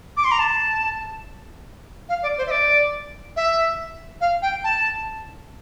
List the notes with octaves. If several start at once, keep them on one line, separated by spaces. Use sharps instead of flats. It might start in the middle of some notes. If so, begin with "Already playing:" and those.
D6
C6
A#5
A5
F5
D5
C5
E5
D5
E5
F5
G5
A5